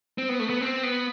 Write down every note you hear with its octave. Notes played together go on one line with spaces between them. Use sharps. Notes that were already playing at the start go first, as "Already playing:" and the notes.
C4
B3
A3
B3
C4
B3